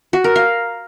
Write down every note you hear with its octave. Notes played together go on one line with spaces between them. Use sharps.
F#4
A#4
F5